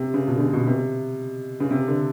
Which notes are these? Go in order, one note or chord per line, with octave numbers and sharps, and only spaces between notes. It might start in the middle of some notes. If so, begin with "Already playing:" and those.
Already playing: C3
C#3
B2
D3
C#3
B2
C3
C#3
C3
D3